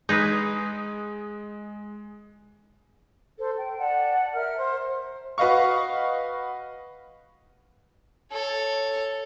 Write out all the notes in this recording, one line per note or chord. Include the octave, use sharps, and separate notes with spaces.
G#3 D#4 G#4 B4 D#6
A4 C5
G5
D5 F#5 A5
A#4 E5 F6
C5
F#4 B4 D#5 F5 C#6
A4 C#5